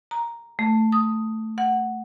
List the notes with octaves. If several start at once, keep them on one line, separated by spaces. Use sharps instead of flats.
A#5
A3
D#6
F#5